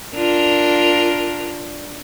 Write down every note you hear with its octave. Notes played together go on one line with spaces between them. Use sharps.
D4 F4 A#4